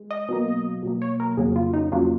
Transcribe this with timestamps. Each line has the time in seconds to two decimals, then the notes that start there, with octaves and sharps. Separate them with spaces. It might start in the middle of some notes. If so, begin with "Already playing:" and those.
Already playing: G#3
0.11 D#5
0.29 B2 F#3 A#3
0.83 B2 F#3 A#3
1.02 C#5
1.20 A#4
1.37 F2 C#3 F#3 A#3 G#4
1.56 F4
1.74 D#4
1.92 F2 C#3 F#3 A#3 F4